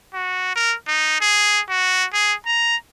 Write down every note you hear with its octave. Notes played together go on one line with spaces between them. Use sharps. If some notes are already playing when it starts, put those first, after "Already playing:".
F#4
A#4
D#4
G#4
F#4
G#4
A#5